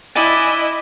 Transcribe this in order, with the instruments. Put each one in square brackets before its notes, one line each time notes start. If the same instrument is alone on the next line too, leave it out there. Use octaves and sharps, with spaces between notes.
[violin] E4 D#5 [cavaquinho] D5 [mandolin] G#5 D6 F#6